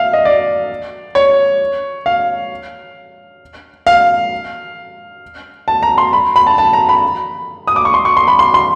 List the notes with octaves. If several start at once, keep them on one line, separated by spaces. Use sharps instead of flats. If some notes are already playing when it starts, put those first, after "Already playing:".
Already playing: E5 F5
D#5
D5
C#5
F5
F5
A5
A#5
C6
B5
B5
A5
A5
A#5
B5
D#6
D6
C#6
C6
C#6
C6
B5
C6
C6